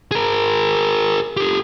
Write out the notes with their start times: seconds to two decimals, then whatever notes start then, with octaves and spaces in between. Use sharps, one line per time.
0.11 G#4 A#4
1.37 G4 A4